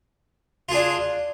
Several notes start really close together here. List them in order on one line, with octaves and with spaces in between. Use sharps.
F4 G#4 D4